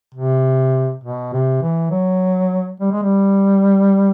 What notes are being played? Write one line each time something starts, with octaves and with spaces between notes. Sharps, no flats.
C3
B2
C3
E3
F#3
G3
G#3
G3